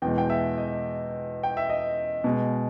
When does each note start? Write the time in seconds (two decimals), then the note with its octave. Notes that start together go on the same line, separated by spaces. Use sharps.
0.02 E2 B2 G#3 G5
0.18 G5
0.30 E5
0.58 D#5
1.43 G5
1.57 E5
1.69 D#5
2.24 B2 G#3